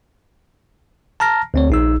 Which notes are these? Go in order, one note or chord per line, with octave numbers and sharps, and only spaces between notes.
A5 A#5 F6 A#6
D2 C4 C#5
A#1 D#4 E6